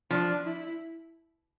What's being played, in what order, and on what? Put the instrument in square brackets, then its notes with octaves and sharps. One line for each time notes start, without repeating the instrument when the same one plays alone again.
[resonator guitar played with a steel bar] F3 [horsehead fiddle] D4
[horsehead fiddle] E4